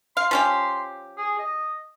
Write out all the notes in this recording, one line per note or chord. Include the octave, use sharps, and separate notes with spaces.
F5 C6
F3 C#4 G4
G#4
D#5